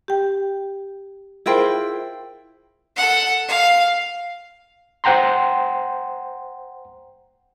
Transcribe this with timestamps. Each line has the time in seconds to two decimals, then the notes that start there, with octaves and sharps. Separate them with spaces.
0.08 G4 G5
1.46 E4 F4 G#4 A#4 C5 G5
2.97 A4 F#5
3.48 F5
5.04 C5 F#5 G5 A#5 C6